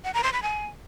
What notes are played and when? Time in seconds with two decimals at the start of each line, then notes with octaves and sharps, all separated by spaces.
0.04 F#5
0.14 A#5
0.23 C6
0.33 B5
0.43 G#5